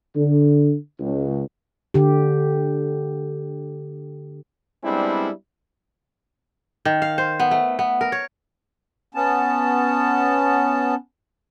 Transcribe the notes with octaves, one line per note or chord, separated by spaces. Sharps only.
D3
C#2
D3 G4
G3 G#3 B3 C4 D4 E4
D#3
F5
C5
B3
A3
B3
A#4
C#5
B3 C#4 A5